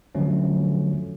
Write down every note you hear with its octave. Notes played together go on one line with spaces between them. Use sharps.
D3 F3 F#3 A3 C#4